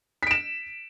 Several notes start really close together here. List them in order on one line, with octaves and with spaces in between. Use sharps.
B6 D7 E7